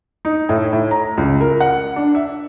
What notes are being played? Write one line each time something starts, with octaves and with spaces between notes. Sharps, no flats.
D#4
A2
A2
A#5
C#2
A#4
F#5
D4
E5